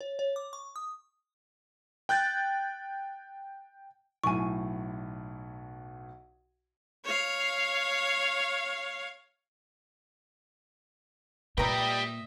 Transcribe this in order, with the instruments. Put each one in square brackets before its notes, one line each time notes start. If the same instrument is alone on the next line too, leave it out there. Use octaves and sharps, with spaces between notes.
[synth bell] C#5
C#5
D6
C#6
D#6
[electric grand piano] G5 F#6 G6 A6
[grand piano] B1 A2 [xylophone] G#5 C#6
[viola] C#5 F5
[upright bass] A#2 [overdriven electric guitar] G3 G5 [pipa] B4 A#5 [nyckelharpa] D#5 E5